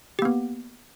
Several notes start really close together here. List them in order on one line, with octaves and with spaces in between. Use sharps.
G4 A#3 B3